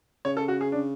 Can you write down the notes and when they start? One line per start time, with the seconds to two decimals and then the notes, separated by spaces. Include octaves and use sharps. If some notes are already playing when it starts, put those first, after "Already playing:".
0.25 C#3 C#5
0.37 A4
0.48 F#4
0.61 G#4
0.72 D4